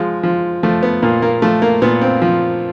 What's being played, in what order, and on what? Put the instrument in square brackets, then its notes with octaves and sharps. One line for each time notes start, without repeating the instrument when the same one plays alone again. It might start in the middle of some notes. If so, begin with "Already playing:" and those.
Already playing: [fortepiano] F3 G#3
F3
F3 A3
B3
A#2 A#3
A#3
F3 A3
A#3
A#2 B3
C4
F3